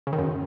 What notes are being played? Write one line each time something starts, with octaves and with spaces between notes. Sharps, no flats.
C#3
D#3
F#2